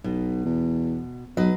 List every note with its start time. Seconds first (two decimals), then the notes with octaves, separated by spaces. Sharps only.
0.04 B1 B2
0.45 E2
1.37 B1 F#3 B4 D#5